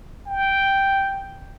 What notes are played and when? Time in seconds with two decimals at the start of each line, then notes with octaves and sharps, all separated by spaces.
0.27 G5